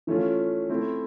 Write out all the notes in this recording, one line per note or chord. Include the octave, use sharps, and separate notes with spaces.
E3 A3 C#4 F4
A3 C4 E4